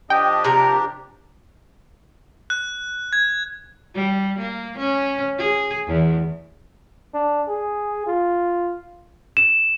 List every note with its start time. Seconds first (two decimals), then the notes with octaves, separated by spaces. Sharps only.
0.10 F3 D4 G4 D#5 G5
0.44 C3 A#4 A#5
2.50 F#6
3.13 G#6
3.94 G3
4.39 A#3
4.78 C#4
5.38 G#4
5.87 E2
7.14 D4
7.48 G#4
8.07 F4
9.37 E7